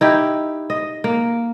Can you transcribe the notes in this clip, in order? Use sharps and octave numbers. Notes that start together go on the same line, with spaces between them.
D#4 E4 G4
D#5
A#3